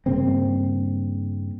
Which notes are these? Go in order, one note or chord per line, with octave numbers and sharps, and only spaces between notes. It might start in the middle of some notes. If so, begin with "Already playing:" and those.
G2 C#3 A#3 C4